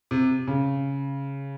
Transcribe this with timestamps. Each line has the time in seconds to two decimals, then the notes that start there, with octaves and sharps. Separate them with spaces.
0.11 C3
0.48 C#3